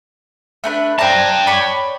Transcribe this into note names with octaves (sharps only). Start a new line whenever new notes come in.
A3 D4 B4
C5 D5 G5 A5 A#5
C#5 D5 B5